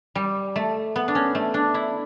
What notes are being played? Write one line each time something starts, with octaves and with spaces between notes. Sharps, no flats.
G3
A3
B3
D4
C#4
A3
D4
E4